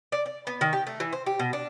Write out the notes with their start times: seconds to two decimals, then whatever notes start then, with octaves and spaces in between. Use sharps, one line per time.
0.12 D5
0.26 D5
0.47 B3
0.61 D#3
0.73 G4
0.87 A3
1.00 E3
1.13 C5
1.26 G4
1.39 B2
1.53 D4